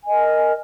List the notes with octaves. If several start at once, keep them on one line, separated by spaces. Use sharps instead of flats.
A#4 D#5 G#5